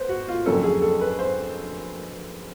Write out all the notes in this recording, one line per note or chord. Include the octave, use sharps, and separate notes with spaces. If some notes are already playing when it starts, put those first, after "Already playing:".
Already playing: B4 C5
F#4
F4
F2 D3 F#3 A#3 C#4 A4
G#4
A4
B4
C5